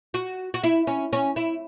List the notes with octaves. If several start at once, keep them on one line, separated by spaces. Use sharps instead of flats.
F#4
F#4
E4
C#4
C#4
E4